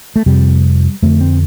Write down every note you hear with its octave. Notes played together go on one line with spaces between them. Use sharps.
A3
F2 C3 G3
F2 D3 A3
C4